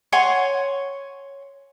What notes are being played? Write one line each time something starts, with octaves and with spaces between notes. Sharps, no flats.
C#5 F#5 G#5 C6